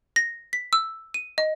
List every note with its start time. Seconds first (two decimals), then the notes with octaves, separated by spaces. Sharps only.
0.16 A#6
0.53 B6
0.73 E6
1.14 D#7
1.38 D#5